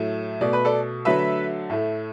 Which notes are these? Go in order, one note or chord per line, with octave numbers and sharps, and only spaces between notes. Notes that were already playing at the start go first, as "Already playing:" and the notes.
Already playing: A2 F#3 A3
B2 A3 D5
B4
A4 D5
D3 F#3 A3 B4 E5
A2 A3